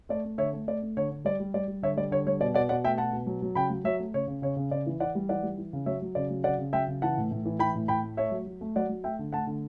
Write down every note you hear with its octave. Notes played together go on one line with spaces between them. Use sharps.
A3 D5
A3
D3 C#5 E5
A3
A3 D5
A3
D3 C#5
D3
G3 D5
G3
G3 D5
G3
D3 C#5 E5
G3 D5
D3 C#5
G3 C#5
B2 D5
B2 D5 F#5
B2 D5 F#5
A3 E5 G5
B2 F#5 A5
B2
F#3
F#3
C#3 G5 B5
F#3
F#3 C#5 E5
A3
C#3 C#5
C#3
C#3 C#5
C#3
C#3 D5
E3
E3 D5 F#5
G3
E3 D5 F#5
G3
E3
C#3
F#3 C#5 E5
F#3
C#3 D5
F#3
C#3 D5 F#5
C#3
F#3 E5 G5
C#3
E3 F#5 A5
A2
A2
E3
E3 G5 B5
A2
A2 G5 B5
A3
A3 C#5 E5
F#3
F#3
A3
F#3 D5 F#5
F#3
A3 E5 G5
D3
A3 F#5 A5
D3